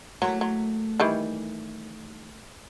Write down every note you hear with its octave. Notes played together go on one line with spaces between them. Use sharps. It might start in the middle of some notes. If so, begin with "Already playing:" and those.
F#3 A3 A#3 E4
F#3
D#3 E3 G3